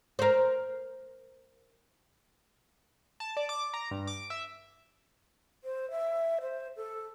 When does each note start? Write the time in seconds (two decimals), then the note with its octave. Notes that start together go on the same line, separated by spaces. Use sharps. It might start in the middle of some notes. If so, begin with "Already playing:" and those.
0.19 A#4 C5
3.20 A5
3.37 D5
3.49 D6
3.74 A#5
3.91 G2
4.07 D6
4.30 E5
5.63 C5
5.91 E5
6.41 C5
6.76 A4